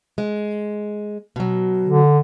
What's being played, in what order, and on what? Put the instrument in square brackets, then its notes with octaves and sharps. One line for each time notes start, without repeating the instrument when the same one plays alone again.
[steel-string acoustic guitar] G#3
B2 F#3
[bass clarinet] D3